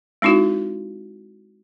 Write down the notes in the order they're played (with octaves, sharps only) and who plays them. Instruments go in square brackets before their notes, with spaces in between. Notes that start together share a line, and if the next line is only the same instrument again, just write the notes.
[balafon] G#3 C4 D#4 E4 F#4